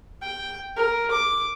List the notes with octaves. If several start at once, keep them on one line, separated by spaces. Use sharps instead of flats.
G5
A#4
D6